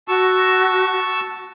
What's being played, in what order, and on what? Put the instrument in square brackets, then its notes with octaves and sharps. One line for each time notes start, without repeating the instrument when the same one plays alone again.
[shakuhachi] F#4 [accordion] A5 C#6 E6